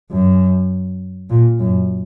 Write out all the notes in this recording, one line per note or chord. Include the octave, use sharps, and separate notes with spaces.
F#2
A#2
F#2